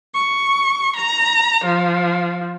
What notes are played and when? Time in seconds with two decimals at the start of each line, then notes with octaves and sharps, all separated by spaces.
0.14 C#6
0.96 A#5
1.64 F3